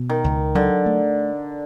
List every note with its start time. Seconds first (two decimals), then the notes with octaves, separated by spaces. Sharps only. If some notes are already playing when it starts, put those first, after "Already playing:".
Already playing: B2
0.10 D#3
0.24 C#2
0.55 D3 F#3
0.86 A3